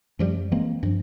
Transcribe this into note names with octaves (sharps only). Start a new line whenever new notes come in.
F#2 F3 G3 A3
E3 G#3 A#3 C4
G2 F3